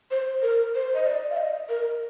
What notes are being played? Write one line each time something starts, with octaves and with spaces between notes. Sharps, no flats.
C5
A#4
C5
D#5
D5
F5
D#5
A#4